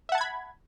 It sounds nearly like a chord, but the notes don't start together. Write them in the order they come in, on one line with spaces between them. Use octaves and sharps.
E5 F#5 A5 G#6 B5